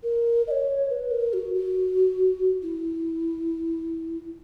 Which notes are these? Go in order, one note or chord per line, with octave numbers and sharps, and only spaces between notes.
A#4
D#5
C#5
B4
A#4
F#4
F#4
E4